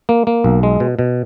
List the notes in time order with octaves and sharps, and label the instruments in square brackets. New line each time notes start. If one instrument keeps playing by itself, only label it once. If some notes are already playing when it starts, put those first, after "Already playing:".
[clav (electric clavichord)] A#3
A#3
B1
G#3
B2
B2